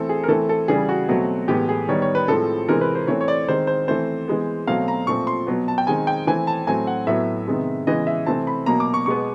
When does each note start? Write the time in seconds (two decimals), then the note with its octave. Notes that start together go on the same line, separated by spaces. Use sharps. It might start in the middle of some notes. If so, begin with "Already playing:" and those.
Already playing: E3 A3 C4 A4
0.09 G#4
0.24 A#4
0.28 E3 A3 C4 A4
0.49 A4
0.68 C#3 E3 G3 G#4
0.89 F#4
1.09 B2 F#3 A3 C4
1.48 A2 E3 G#3 B3 G4
1.69 G#4
1.88 D#3 G3 B3 C#5
2.02 C#5
2.15 B4
2.28 A2 F3 G#3 C4 A4
2.68 C3 E3 G#3 C4 A#4
2.81 B4
2.95 C5
3.07 E3 A3 C4 C#5
3.21 C#5
3.28 D5
3.48 D#3 G#3 C4 C5
3.67 C5
3.88 E3 A3 C4 C5
4.28 E3 G#3 B3
4.67 B2 F#3 A3 C4 F5
4.88 A#5
5.07 A#2 F3 A3 C4 C#6
5.27 C6
5.47 B2 F#3 B3
5.68 A5
5.78 G5
5.87 D#3 G#3 C4 G#5
6.07 G5
6.27 E3 A3 C4 G#5
6.47 A5
6.67 A2 F#3 A3 C4 G#5
6.87 F#5
7.07 A2 F#3 B3 E5
7.47 C3 D#3 G#3 B3
7.87 C#3 E3 G#3 B3 D#5
8.07 E5
8.26 C3 E3 A3 C4 A5
8.47 B5
8.66 B2 F#3 A#3 A#5
8.80 D6
8.94 C#6
9.06 B2 G#3 B3 C#6